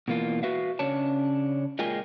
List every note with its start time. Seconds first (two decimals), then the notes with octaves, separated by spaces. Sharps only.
0.08 B2 E3 A#3 F4
0.43 F#4 B4 E5 F5
0.79 C#3 C#4 D4 C#5 A5
1.79 A#2 G#3 F4 A#4 G5 G#5